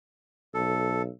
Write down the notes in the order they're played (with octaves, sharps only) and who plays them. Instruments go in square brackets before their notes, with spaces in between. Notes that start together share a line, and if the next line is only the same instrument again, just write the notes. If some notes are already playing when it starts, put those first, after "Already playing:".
[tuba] B1 [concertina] A4